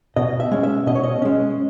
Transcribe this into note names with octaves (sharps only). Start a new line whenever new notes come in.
B2 D#5
E5
G#3 C#4
E5
B2 D#5
C#5
D#5
G#3 C#4